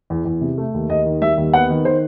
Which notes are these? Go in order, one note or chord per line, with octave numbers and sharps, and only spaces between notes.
E2
E2
C3
A3
D#2
D#2 D#5
D#3
G3 E5
D#2
B3 F#5
D#3
D#3 C5